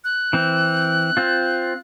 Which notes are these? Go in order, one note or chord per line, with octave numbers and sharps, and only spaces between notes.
F#6
E3 C4
C4 F4